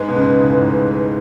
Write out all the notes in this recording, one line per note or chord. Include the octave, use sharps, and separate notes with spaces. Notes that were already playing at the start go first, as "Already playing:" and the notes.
Already playing: G#2 G#3 B4
B2
C#2 C#3
G#2
A2
G#2